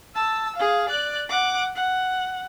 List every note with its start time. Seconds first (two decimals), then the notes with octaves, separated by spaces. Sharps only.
0.15 A5 E6
0.56 G#4 F5
0.89 D5 F#6
1.30 F#5 D6
1.76 F#5